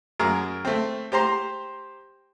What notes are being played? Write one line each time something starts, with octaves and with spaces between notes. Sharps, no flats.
F#2 G#4 A#4
A3 C4
G4 C5 A#5 C6